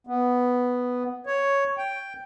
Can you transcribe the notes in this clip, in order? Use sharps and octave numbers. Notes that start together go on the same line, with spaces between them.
B3
C#5
G5